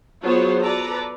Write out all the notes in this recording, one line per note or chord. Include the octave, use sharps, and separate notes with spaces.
F#3 B3 F4 G#4 C5 C#5
A4 B4 D5 A#5